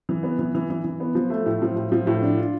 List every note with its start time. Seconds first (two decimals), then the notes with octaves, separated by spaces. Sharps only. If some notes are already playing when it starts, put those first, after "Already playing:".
0.09 E3
0.23 B3
0.39 E3
0.55 E3
0.70 E3
0.84 E3
1.00 B3
1.15 F3
1.30 A3
1.46 A2
1.62 F3
1.76 A2
1.92 F3
2.07 A2
2.22 D4
2.37 F4